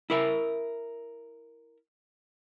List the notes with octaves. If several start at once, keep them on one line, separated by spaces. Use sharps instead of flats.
E4 A#4 E5